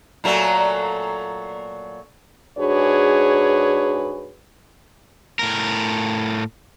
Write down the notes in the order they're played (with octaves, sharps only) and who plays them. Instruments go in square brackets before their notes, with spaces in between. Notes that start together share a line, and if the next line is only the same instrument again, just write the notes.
[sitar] A#2 F#3 A3
[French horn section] G#2 D4 F#4 G#4 B4 C#5
[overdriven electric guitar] A2 A#4